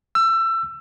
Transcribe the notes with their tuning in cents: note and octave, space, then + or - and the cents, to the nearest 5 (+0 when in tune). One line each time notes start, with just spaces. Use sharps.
E6 +25